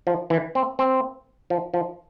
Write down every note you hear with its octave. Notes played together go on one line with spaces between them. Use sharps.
F3
E3
C4
C4
F3
F3